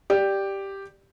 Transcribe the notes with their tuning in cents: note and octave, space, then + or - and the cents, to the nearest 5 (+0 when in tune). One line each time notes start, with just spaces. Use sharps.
G4 +0 D5 +5